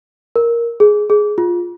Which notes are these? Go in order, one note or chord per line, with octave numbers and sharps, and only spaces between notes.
A#4
G#4
G#4
F4